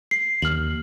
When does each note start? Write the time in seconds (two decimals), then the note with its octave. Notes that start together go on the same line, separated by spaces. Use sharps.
0.11 C7
0.42 D#2 F6 F#7